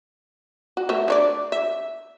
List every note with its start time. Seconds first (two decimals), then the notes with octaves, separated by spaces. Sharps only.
0.77 F#4
0.89 A3 A#4 E5
1.08 D4 C#5 D5
1.52 E5